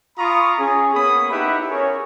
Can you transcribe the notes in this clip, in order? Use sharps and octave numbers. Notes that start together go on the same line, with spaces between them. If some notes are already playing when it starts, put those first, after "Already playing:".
F4 A#5 B5 C#6 D#6
C#4 G#4
A#3 B3 G#4 C#5 B5 D#6
D#4 E4 G4 B4 E5 F#5
C#4 G#4 A#4 C#5